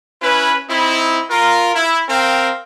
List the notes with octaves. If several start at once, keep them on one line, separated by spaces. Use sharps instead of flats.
C#4 E4 B4
C4 D#4 E4
F4 A#4
E4
C4 A#4 F5 G5